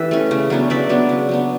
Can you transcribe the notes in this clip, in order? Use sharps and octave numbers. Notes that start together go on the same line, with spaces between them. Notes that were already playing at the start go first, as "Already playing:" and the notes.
Already playing: E3 G4 A4 B4 E5
A3 C#4
C#3
F#3 B3 D4
C#3 D5 E5
F#3 B3 D4
C#3
F#3 B3 D4